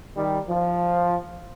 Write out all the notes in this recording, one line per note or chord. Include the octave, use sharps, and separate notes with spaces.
D#3 G3
F3